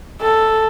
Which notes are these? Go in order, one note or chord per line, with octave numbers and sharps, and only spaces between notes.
A4